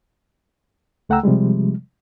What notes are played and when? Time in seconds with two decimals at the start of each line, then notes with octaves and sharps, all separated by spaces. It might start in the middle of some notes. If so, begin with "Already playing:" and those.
1.09 C#2 A3 F#5 G5 A#5 E6
1.23 C3 F3 G3 G#3